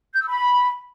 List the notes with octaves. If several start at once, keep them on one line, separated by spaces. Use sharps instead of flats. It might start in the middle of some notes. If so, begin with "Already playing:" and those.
G6
E6
B5